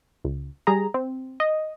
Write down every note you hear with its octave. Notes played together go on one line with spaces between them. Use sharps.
C#2
G3 G#4 A#5
C4
D#5